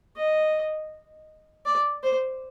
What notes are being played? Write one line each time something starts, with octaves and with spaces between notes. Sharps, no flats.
D#5
D5
C5